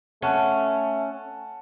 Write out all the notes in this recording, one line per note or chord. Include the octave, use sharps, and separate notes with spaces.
A3 C#4 F#5 A5 F#6